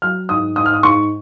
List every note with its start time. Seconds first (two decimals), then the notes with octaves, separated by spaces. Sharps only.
0.02 F#3 F6
0.29 G#2 D#6
0.56 G#2 D#6
0.66 F6
0.74 D#6
0.83 G#2 C#6